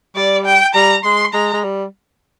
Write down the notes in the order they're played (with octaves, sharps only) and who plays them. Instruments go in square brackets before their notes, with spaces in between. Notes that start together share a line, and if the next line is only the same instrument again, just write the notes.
[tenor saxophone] G3 [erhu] D5
[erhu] G5
[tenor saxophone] G3 [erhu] A#5
[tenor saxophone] G#3 [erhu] C6
[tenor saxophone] G#3 [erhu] A#5
[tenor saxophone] G#3
G3